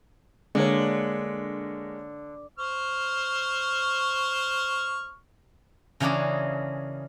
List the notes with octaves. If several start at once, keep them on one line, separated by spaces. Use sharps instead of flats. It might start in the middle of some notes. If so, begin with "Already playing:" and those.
D3 G#3 A#3 C#5
C5 C#6 F6
C#3 E3 A#3 D4 F#4 G#4